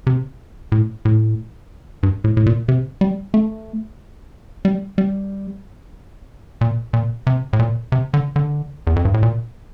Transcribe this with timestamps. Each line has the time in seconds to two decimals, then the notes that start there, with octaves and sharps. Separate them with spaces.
0.07 C3
0.72 A2
1.05 A2
2.03 G2
2.24 A2
2.37 A2
2.46 A#2
2.68 C3
3.01 G3
3.34 A3
4.65 G3
4.98 G3
6.61 A#2
6.93 A#2
7.27 C3
7.53 A2
7.59 A#2
7.92 C3
8.14 D3
8.36 D3
8.87 E2
8.96 F2
9.05 G2
9.14 A2
9.23 A#2